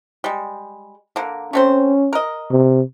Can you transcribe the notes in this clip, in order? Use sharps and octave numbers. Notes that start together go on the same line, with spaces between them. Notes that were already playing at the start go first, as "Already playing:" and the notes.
G3 G#3
D3 A#3
A3 C4 C#4 C5
A#4 D#5
C3